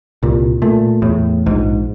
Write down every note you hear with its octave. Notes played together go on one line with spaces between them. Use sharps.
C2 A#2
A#2 A3
E2 A2
A#1 G#2